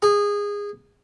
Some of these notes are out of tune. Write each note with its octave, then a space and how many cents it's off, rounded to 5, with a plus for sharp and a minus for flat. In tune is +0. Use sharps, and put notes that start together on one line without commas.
G#4 -20